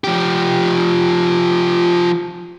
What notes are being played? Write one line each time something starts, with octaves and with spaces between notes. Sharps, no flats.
F3 G4